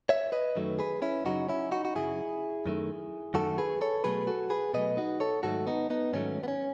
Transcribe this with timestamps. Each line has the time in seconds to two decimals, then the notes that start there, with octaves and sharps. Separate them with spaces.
0.09 C#5 E5
0.32 B4 D#5
0.56 F#2 D#3 F#3 A3
0.79 G#4 B4
1.02 C#4 E4
1.25 F#2 C#3 F#3 D#4 F#4
1.49 C#4 E4
1.71 D#4 F#4
1.85 F#4
1.95 F#2 C#3 F#3 E4 G#4
2.66 F#2 D#3 A3
3.34 F#2 D#3 A3 F#4 A4
3.58 G#4 B4
3.81 A4 C#5
4.04 B2 F#3 A3 G#4 B4
4.27 F#4 A4
4.50 G#4 B4
4.74 B2 F#3 A3 B4 D#5
4.97 D#4 F#4
5.20 A4 C#5
5.43 G#2 D#3 F#3 A3 F#4 A4
5.67 B3 D#4
5.90 B3 D#4
6.13 G#2 D#3 F#3 A3 C#4
6.43 B3
6.48 C#4